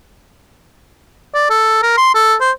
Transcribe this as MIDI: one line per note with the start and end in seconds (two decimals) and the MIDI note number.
1.34 1.46 74
1.50 1.79 69
1.83 1.95 70
1.97 2.11 84
2.15 2.35 69
2.40 2.51 72